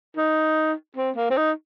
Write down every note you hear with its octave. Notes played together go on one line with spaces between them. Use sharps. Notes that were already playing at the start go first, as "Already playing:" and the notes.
D#4
C4
A#3
C4
D#4